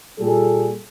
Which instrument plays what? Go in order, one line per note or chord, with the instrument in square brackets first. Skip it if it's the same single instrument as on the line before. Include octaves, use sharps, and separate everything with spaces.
[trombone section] A#2 G3 G#4 A4